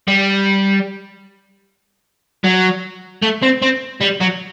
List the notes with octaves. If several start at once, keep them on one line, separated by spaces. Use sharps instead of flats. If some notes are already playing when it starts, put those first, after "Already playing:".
G3
F#3
A3
C4
C4
G3
F#3